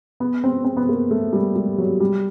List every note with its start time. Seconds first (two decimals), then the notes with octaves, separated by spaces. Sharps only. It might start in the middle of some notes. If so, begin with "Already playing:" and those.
0.20 B3
0.44 C4
0.65 C4
0.77 B3
0.89 A#3
1.11 A3
1.33 G3
1.56 G3
1.78 F#3
2.00 G3